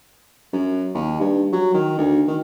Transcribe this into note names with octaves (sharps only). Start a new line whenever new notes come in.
F#2
D#2
G2
F#3
D#3
D2
D#3